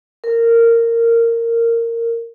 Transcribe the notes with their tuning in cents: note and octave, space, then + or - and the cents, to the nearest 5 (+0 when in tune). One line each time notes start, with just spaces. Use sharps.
A#4 -15